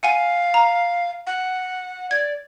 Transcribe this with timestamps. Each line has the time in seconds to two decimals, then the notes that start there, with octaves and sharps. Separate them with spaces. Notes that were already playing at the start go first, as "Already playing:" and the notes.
0.03 F5 F#5 G#5 D#7
0.54 A#5
1.27 F#5
2.11 D5 G#6